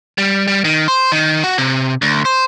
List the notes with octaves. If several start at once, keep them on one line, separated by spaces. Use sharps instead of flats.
G3
G3
D#3
C5
D#3
F#4
C3
D2
C5